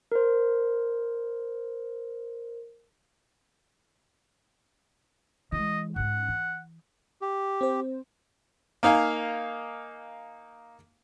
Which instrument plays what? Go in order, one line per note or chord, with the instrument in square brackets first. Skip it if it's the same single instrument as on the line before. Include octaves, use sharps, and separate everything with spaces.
[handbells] A#4 C5
[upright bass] E3 G#3 [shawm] D#5
[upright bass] G#2 C#4 [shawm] F#5
[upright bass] E3
[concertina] G4
[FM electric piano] C4 C5
[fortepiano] A#3 D#4 F5 G#5